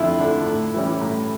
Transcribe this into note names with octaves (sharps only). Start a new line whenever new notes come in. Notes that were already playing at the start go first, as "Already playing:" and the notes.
Already playing: F2 D3 A3 D4 E4 F4
D3 A3 D4
A2
E3 G3 C#4
A2